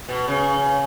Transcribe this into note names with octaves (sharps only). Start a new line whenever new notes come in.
B2
C#3